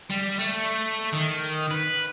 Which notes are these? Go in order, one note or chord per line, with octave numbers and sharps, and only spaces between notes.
G3
A3
D#3
B4